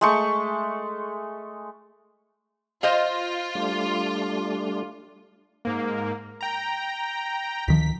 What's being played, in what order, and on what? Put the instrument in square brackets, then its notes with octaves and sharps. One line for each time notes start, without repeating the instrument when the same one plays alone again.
[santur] G#3 A3 C#6
[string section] F4 [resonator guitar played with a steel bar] C5 D#5 F5
[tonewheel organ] G3 A3 D4
[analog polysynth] G#2 A#3
G5 A#5
[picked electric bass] D2 D#3 F3 [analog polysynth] B6